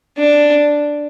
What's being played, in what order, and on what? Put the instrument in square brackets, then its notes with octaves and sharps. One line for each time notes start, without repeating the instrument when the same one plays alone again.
[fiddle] D4